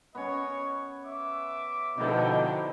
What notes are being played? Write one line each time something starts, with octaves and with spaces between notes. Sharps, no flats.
B3 C#4 B4 C#5 D#5
E5 D6
B2 D3 F3 D#4 E4 D#5 G5